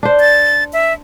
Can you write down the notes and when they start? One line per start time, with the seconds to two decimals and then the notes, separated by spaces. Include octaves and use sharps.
0.03 D4 C5
0.20 A6
0.73 E5